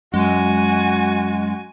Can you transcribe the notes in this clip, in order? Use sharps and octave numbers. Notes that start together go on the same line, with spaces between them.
F#2 G#3 F#4 G#5